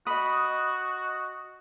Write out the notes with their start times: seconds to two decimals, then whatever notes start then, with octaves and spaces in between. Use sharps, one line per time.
0.07 F#4 D#5 B5 D#6